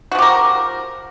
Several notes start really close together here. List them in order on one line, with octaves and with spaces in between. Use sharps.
F#4 F3 G4 A#4